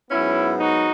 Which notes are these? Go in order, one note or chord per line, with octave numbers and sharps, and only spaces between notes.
G#2 F#3 B3 C#4 E4
D#4 F#4